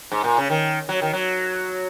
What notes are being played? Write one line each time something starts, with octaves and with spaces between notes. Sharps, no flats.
G#2
A#2
C#3
D#3
F#3
D#3
F#3